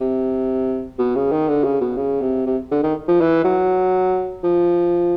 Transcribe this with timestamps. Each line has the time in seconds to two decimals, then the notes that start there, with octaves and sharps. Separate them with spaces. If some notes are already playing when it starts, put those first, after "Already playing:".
0.01 C3
0.99 B2
1.16 C#3
1.32 D#3
1.48 D3
1.64 C#3
1.81 B2
1.97 C#3
2.22 C3
2.46 C3
2.71 D3
2.84 D#3
3.08 F3
3.21 E3
3.45 F#3
4.44 F3